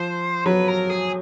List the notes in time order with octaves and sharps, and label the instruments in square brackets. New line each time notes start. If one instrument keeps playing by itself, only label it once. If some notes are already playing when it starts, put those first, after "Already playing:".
Already playing: [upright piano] F3 [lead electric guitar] C5
[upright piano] F#3 [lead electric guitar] B4
[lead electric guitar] A#4
G#4